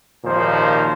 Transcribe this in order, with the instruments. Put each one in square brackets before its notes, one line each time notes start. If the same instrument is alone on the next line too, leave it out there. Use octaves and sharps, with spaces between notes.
[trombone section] G#1 D#2 A#2 D#3 F3 C5